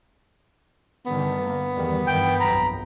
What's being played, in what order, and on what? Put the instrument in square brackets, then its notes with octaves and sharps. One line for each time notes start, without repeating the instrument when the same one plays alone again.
[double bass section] G2 D3 D#3 [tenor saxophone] B3
[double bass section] A#3
E2 D#3 G3
[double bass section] G2 D#3 E3 [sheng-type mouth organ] G5
[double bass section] B1 F2 [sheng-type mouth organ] A#5 B5